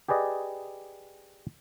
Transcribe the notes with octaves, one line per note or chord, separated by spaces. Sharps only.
G4 G#4 B4 D5 D#5